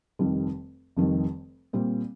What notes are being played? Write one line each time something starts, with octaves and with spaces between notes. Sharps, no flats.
F1 F2 D#3 G3
F1 F2 D#3 G3
A#2 G3 C4